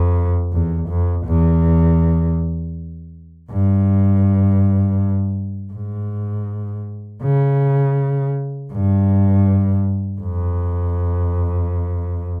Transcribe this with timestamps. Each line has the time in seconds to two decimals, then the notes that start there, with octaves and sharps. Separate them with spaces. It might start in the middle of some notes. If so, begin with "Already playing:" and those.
Already playing: F2
0.52 E2
0.89 F2
1.26 E2
3.51 G2
5.73 G#2
7.23 C#3
8.72 G2
10.20 F2